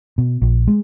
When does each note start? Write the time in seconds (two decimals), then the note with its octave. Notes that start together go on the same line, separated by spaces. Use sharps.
0.18 B2
0.42 A#1
0.67 G#3